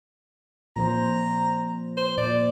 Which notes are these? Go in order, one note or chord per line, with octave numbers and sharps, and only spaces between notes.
A#2 F3 C5 A#5
C5
A#2 D5